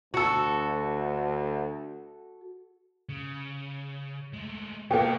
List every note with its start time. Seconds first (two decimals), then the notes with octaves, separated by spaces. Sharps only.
0.14 D2 F#4 A4
3.09 C#3
4.34 G#3 A3
4.91 B2 A#3 B3 F#5 G5